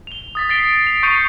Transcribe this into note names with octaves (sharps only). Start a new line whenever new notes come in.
F7 G7
D#6 A6 B6
A6 B6 C7 D7 G7
F7
C#6 G6 C7 C#7 D#7 F7